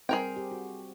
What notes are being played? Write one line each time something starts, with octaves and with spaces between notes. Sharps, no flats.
G3 C4 G#4 A#4 G5
G4
F#4